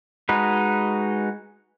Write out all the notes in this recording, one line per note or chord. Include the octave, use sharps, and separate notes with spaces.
G#3 D#4 F#4 B4